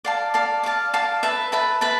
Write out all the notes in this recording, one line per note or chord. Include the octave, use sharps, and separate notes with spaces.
D5 F5 A5
D5 F5 A5
D5 F5 A5
D5 F5 A5
B4 E5 A5
B4 E5 A5
B4 E5 A5